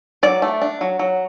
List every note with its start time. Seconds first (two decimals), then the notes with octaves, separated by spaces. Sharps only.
0.23 F#3 D5
0.42 A3
0.62 D4
0.81 F#3
0.99 F#3